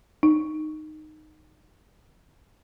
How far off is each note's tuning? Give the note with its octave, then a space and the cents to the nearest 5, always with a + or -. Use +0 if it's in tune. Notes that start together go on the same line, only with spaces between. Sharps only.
D#4 -10